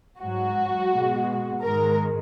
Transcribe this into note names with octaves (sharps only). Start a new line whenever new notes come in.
G#2 F#3 F#4
B2 G#3
G#2 D#3 G#3 A#4